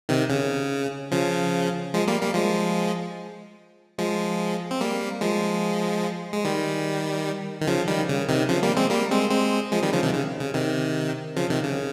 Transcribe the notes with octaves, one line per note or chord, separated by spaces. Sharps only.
C3 D#3
C#3
C#3 F3
F3 G#3
G3 A#3
G3 A#3
F3 G#3
F3 G#3
C4
G3 A#3
F3 G#3
G#3
D#3 G3
D#3
C#3 F3
D#3 G3
C#3
C3 D#3
C#3 F3
G3 A#3
G#3 C4
G3 A#3
G#3 C4
G#3 C4
F3 G#3
D#3 G3
C#3 F3
C3 D#3
C#3
C#3
C3 D#3
C#3 F3
C3 D#3
C#3